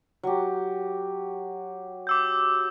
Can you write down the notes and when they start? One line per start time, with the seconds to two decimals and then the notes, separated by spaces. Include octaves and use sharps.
0.23 F#3 G4
2.07 D6 E6 G6